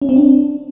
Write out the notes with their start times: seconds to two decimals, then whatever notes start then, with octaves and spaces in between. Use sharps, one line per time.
0.02 C#4
0.09 C4
0.16 D4